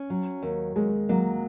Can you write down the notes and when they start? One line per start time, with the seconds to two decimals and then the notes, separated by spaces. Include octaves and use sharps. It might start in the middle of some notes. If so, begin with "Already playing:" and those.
Already playing: C#4
0.10 F#3
0.42 D#2
0.76 D#2 G#3
1.09 F#3 A#3